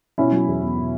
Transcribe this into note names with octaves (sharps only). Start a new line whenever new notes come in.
B2 C#4 E4
F#3
E2
E2
B2